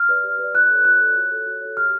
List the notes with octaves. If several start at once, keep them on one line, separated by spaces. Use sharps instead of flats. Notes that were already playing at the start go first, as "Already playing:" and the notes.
Already playing: F6
B4 D5
G4
B4 D5
F4 F#6
A4 C#5
F4 F#6
A4 C#5
F#4
A4 C#5
F#4
A4 C#5
G4 F6